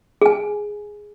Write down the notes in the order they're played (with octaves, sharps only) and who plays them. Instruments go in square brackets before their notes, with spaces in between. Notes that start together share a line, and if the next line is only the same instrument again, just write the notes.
[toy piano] G#4 G#5